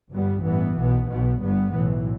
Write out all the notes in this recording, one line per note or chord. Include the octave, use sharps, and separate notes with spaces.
G1 G2 G3 B3
A1 G2 E3 B3
B1 B2 B3
B1 B2 B3
G1 G2 G3 B3
B1 A2 E3